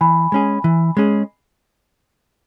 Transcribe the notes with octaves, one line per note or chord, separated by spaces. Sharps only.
E3 G#5 B5
G#3 C#4 G#4
E3
G#3 C#4 G#4